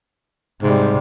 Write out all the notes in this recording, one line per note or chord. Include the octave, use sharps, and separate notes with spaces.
G#2 C3 G3